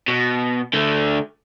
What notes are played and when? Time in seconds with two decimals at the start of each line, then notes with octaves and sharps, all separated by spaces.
0.08 B2
0.74 D3 A3